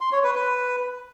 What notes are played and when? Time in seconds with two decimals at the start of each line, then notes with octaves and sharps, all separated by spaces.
0.01 C6
0.12 C#5
0.24 B4
0.35 B4